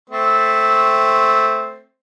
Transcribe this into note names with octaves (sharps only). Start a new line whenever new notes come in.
A3 C4